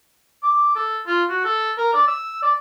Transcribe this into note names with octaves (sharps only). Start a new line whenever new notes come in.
D6
A4
F4
F#4
A4
A#4
D5
E6
D5